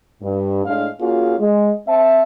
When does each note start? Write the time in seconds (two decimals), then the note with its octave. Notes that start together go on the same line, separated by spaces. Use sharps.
0.22 G2
0.65 A2 G#3 D4 F5
1.01 A#3 C#4 F4 F#4 G#4 F5
1.39 G#3
1.88 C4 E5 A5